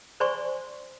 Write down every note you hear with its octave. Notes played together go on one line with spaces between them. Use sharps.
C5 D5 G#5 C6 C#6